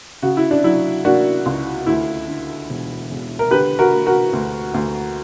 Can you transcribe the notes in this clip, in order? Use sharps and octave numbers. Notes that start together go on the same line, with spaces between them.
C#3 F#4
E4
D4
F#3 E4
A#3 D4 F#4
C#2
D2 E4
D3
E1
E1
A#4
D3 G4 B4
F#4 A#4
A#3
F#4 A#4
D2
D2